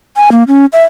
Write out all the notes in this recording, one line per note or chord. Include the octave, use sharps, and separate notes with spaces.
G#5
A#3
C#4
E5